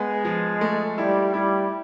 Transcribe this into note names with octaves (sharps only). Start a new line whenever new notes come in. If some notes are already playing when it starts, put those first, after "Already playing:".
Already playing: G#3 B3
F3
A3
G3 E4
G3 E4